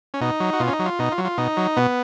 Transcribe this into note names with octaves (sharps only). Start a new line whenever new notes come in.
C#4
B2 D#4
F#3
F#4
B2 F4
C#4
D#4
F#3
F4
B2 D#4
F4
F#3
F4
B2 D#4
F#3
B2 B3